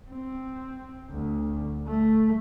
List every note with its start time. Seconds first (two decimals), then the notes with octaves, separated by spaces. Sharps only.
0.10 C4
1.11 D2
1.87 A3